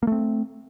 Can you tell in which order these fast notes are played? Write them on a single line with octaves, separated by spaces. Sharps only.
A#3 A3 C4